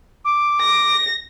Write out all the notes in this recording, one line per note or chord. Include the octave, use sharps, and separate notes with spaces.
D6
A#6